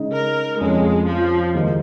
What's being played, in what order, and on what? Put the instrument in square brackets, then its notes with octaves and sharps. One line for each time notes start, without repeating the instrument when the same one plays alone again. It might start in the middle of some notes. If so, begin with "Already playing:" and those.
Already playing: [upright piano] C#3 G#3 D#4
[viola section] A#4
[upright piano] F2 F3 C#4 [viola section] G#3
[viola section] F3
[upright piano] D#2 D#3 G#3 D#4